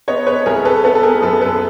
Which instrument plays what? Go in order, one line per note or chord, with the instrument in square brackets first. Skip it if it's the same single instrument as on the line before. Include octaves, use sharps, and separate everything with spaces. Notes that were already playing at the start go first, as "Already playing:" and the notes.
[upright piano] B3 C#5 D#5
B4 C#5
C2 G#4 A#4
A4 B4
B3 A4 B4
A4
G#4 A#4
F#2 A4 B4
A4 B4